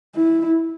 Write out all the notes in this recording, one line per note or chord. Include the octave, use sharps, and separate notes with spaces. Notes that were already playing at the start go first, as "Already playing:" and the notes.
E4